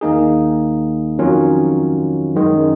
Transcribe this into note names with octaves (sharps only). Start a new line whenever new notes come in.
D#2 D#3 A#3 D#4 G#4
F2 D#3 F#3 C#4 F4
F#2 D#3 G#3